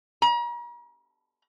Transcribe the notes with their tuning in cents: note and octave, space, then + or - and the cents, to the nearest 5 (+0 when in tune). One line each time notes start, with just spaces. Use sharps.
A#5 +40